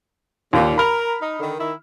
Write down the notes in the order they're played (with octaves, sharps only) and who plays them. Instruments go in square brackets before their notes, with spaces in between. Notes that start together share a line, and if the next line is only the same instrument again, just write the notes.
[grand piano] D#2 [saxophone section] A#2
[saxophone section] A#4 [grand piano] B5 F6
[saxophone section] D#4
D3 D#3
D#3 E4